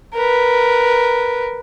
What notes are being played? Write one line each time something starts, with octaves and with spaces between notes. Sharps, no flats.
A#4 B4